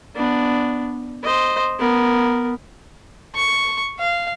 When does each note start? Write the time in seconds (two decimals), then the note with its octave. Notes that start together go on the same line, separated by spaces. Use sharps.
0.15 B3 D4
1.23 C5 D#5
1.79 B3 A#4
3.35 C#6
3.99 F5